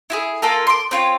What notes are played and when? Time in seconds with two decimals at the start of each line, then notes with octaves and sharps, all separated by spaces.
0.10 E4 F#4 G#4
0.42 A#3 F4 A4 A#4
0.67 C6 D6
0.91 C4 F4 C#5